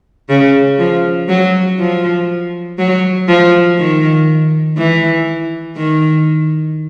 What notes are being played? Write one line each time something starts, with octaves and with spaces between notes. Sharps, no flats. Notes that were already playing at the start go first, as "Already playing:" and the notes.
C#3
F3
F#3
F3
F#3
F3
D#3
E3
D#3